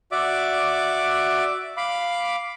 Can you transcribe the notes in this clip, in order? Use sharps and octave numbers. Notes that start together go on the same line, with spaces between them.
F#4 D5 E5 D6
F5 B5 D6